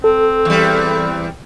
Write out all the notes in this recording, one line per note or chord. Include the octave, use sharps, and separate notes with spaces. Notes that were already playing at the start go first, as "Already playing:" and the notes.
C4 A4
E2 G3